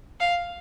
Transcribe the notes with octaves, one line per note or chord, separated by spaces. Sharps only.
F5